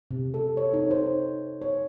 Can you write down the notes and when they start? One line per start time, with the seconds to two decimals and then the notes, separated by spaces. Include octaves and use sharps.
0.11 C3
0.34 A4
0.57 C#5
0.74 D#4
0.91 C5
1.62 C#5